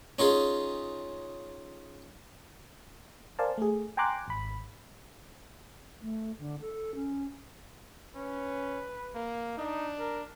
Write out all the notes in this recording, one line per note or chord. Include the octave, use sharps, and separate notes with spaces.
C#4 D#4 F4 G#4
A#4 C5 D5 F5 G#5 A5
A3 G#4
G5 G#5 A#5 C6 D6 F#6
G#1 B5
A3
D3
A4
C#4
C#4 B4
A#3
D4 D#4
A#4